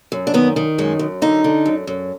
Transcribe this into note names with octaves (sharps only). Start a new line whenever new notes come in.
F#2
D4
D#3 B3
D#3
F#2 G#3
F#2
D3 D#4
D3
F#2
F#2